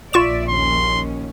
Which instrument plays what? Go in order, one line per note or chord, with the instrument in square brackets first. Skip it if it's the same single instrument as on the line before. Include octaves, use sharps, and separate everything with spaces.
[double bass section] A#1 [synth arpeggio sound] F4 C#6 E7 [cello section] D5 E5
[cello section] D#2 C#4 [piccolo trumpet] C6